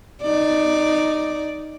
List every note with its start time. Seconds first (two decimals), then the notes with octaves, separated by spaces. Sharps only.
0.23 D#4 D5